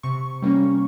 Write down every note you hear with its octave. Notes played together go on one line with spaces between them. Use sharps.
C3 C#6
G3 A#3 C#4